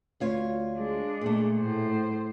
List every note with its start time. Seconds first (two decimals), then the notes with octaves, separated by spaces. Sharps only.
0.20 D2 F4 C#5
0.77 G#3 D4
1.21 A#2 A3
1.60 A2 C5